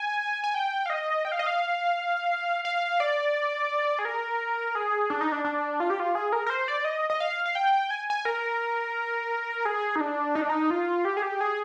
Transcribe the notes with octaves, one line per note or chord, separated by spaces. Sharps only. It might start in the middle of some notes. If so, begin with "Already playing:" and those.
Already playing: G#5
G#5
G5
F5
D#5
G5
F5
D#5
F5
F5
D5
G#4
A#4
G#4
D4
D#4
D4
D4
F4
G4
F4
G#4
A#4
A#4
C5
D5
D#5
D#5
F5
F5
G5
G#5
G#5
A#4
G#4
D#4
D4
D#4
D4
D#4
F4
G4
G#4
G4
G#4